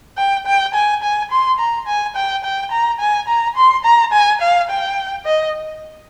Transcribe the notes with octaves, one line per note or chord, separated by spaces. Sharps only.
G5
G5
G#5
G#5
C6
A#5
G#5
G5
G5
A#5
G#5
A#5
C6
A#5
G#5
F5
G5
D#5